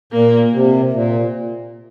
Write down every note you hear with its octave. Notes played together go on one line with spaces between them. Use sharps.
A#2 A#3
C3
A#2